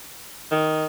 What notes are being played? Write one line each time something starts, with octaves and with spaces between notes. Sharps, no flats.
D#3